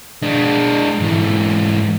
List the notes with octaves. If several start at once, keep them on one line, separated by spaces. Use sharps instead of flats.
G#3 D4
G#2 E3